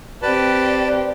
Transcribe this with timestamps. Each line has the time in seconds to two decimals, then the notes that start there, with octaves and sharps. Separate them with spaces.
0.22 C4 G4 B4 D5 A5